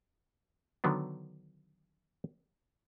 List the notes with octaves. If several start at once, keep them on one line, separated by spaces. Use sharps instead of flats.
D3 D#3 F#3 B3 D4